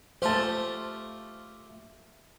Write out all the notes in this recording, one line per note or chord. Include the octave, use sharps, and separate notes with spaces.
A3 F4 G4 C5 A5